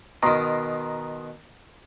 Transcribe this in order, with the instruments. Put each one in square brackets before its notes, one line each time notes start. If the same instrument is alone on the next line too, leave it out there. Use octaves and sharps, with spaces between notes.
[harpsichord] B2 D#3 [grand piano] A#5 C6 D#6